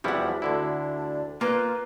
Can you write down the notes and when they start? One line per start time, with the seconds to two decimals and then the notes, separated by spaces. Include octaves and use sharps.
0.04 E2 F3 G3 E4 F#4 F#5
0.42 D2 D3 D4 E4
1.41 A#3 F4 B4